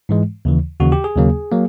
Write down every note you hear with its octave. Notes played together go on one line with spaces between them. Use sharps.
G#2 E3 G#3
D#2 C#3 E3
D#2 C#3 E3 F#4
G4
G#4
D#2 C#3 F#3 A#3
F#3 A#3